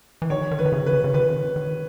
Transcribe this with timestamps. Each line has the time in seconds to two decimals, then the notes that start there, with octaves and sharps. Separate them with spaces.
0.22 E3
0.30 D#3 C#5
0.51 D#3
0.59 B4
0.66 D#3
0.72 C#3
0.86 B4
0.93 C#3
1.04 C#3
1.14 D#3 B4
1.56 D#3